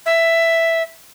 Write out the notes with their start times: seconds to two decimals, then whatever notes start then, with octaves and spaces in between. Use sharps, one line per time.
0.06 E5